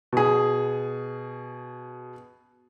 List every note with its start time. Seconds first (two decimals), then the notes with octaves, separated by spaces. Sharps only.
0.13 B2 G#4